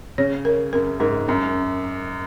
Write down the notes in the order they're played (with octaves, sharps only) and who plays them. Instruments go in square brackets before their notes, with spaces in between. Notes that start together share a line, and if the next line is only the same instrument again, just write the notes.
[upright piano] C#3 [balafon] C#5
[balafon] A#4
[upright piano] F#2 [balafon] A#4
[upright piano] G#2 [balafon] A#4
[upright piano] F#2 [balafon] C#4